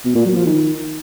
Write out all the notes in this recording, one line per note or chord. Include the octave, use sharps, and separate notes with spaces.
B2
A#2
F#3
F3
D#3